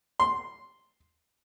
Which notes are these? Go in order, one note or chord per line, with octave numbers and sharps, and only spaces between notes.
C6